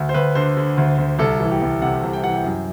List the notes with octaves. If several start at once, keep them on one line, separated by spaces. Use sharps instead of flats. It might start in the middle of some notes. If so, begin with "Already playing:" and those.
Already playing: D2
C5
D2 B4
D3 C5
D3
D2
D2
C2 A4
E3
G4
C2
C3 F#5
C2
G5
E3 F#5
G5
F#2